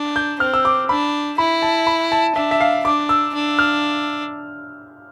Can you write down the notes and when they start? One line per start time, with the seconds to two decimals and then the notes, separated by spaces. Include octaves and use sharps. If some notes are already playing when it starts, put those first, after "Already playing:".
Already playing: D4
0.16 G6
0.40 C4 F6
0.54 E6
0.65 D6
0.89 D4 B5
1.38 E4 B5
1.62 A5
1.87 B5
2.12 A5
2.35 D4 E5
2.51 E5
2.60 F5
2.85 D4 D6
3.09 E6
3.34 D4
3.59 F6